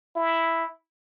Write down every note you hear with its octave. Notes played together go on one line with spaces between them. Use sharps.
E4